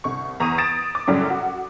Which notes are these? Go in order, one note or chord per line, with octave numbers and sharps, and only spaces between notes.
C2 C#6
E2 A#5 C#6 D#6 D#7
D#6 A6 A#6 D7 E7
D6
F#2 A2 C#3 F#3 G3
F#4